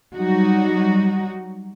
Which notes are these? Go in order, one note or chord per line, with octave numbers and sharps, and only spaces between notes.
F#3 G3 D#4 F#4